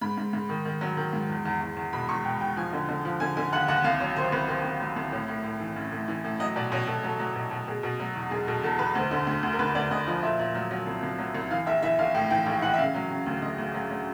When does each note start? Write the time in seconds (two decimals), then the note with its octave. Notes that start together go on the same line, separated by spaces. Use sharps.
0.01 G#2 B5
0.18 G#2
0.33 G#2
0.49 D#3
0.65 D#3
0.81 F#3
0.97 D#3
1.13 G#2
1.29 E2
1.45 E2
1.61 E2
1.77 E2
1.93 B2 B5
2.09 E2 C#6
2.25 B2 G5
2.41 E2 G5
2.57 F3 G#5
2.73 D3
2.89 D3
3.05 F3
3.20 D3 G#5
3.37 D3 G#5
3.52 D#2 F#5
3.68 D#2 F#5
3.84 C2 F5
4.00 F#3 C#5
4.16 D#3 C5
4.32 C2 B4
4.48 D#3 C5
4.64 C2
4.80 F#3
4.96 C2
5.12 A2 C#5
5.28 A2
5.44 A2
5.60 E3
5.76 A1
5.92 A2
6.08 E3
6.24 A2
6.40 F#3 D#5
6.56 B2 D5
6.72 B2 C#5
6.87 B2 A4
7.03 F#3 A4
7.19 F#3
7.35 B2
7.51 B2
7.67 B2 G#4
7.83 B2
8.00 F#3
8.15 E2
8.31 E1 G#4
8.47 B2 A4
8.63 E2 A4
8.79 E2 B4
8.95 D2 C5
9.11 D3
9.27 D2
9.43 D2
9.52 A#4
9.59 D2 B4
9.75 D2 D5
9.91 D2 D#5
10.06 F3 D#5
10.23 A#2 E5
10.39 A#2
10.55 F#3
10.71 F#3
10.87 C2
11.03 C2
11.19 F#3
11.35 C2
11.50 E3 F5
11.66 A#1 E5
11.82 E3 E5
11.98 A#1 F5
12.15 A2 G5
12.30 E3 G5
12.46 A#1
12.62 E3 F#5
12.74 E5
12.78 C#3 F5
12.94 F#3
13.10 C#3
13.26 D2
13.42 D2 D#5
13.58 D2
13.74 F#3
13.90 F#3